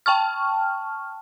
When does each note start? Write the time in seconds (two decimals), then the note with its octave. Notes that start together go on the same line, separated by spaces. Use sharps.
0.06 G5 A5 C#6 F6